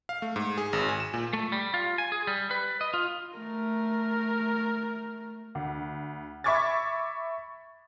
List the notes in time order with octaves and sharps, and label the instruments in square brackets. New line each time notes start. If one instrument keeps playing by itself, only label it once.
[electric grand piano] F5
A3
G#2
G#4
G#1
G#5
E7
A#2
[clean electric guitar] A3
G3
F4
G#5
G#4
G3
B4
D#5
F4
[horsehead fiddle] A3 A#4
[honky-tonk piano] D2
E5 B5 C#6 D6 G#6 A6